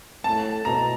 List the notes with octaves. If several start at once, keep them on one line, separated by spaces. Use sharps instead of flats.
A2 A5
B2 A#5